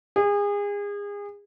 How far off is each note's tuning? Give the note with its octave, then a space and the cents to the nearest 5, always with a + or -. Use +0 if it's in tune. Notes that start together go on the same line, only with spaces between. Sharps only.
G#4 -30